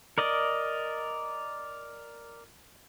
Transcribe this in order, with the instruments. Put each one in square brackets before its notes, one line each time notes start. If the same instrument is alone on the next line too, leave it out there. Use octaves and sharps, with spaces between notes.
[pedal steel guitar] A#4 D5 D#5